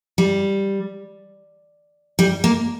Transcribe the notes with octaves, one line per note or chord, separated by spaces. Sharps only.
G3
G3
A#3